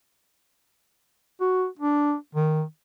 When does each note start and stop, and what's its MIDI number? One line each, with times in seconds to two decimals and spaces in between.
1.41 1.66 66
1.79 2.15 62
2.35 2.63 51